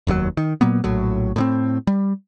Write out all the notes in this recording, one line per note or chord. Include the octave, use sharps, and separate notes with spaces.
F1 D#2 C3 F#3
D#3
A#2 F#3 A#3 B3
A#1 A2 F#3
A2 D#3 C4
G3